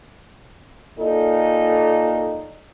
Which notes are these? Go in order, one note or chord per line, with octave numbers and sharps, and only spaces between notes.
A#2 D#4 A4